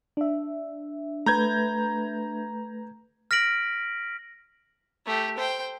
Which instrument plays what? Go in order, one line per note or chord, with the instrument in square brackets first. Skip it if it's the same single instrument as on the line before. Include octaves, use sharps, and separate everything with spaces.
[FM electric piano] D4 E5
[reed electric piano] A3 B4 [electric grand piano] A#5 G6 G#6
[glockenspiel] F6 A#6 B6 D7 F#7
[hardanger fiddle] A3 G4
C5 G5